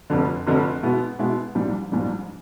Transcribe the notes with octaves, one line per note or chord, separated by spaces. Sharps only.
F1 F2 D3
F1 F2 D3
B2 G#3 B3 E4
B2 G#3 B3 E4
A#1 G#2 E3 G3
A#1 G#2 E3 G3